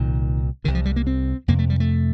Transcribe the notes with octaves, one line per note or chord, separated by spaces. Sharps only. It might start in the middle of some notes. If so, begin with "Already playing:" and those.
Already playing: C2 A#2 D#3
C2 C3 D#3
F3
G3
A#3
C4
F2 C3 A#3
A3
G3
A3